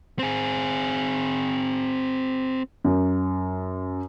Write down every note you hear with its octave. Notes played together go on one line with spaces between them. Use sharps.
C4 G#4
F#2